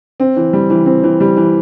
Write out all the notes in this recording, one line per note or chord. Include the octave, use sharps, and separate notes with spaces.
C4
E3
G3
E3
C4
E3
G3
E3